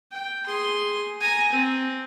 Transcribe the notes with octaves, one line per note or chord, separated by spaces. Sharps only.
G5
G#4 C6
G#5 A#5
C4